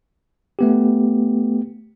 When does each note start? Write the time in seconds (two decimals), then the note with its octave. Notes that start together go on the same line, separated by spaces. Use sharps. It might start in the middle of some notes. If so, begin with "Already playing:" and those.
0.59 A3 B3 G4